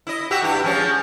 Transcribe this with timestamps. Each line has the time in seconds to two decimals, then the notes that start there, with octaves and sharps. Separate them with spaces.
0.07 E4 D#5
0.31 F#4 G4 E5
0.42 G2 E4 G4
0.64 F3 G#3 C#4